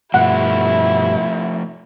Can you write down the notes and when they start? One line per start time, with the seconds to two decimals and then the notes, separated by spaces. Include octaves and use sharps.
0.14 G2 B2 F3 A3 E4 F#5